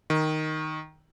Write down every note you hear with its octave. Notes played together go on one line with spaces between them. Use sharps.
D#3